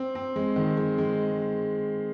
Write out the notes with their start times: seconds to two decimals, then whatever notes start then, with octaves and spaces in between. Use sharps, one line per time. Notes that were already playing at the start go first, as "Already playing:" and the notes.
Already playing: C4
0.15 C4
0.36 G#3
0.56 D#3
0.77 G#3
0.98 G#3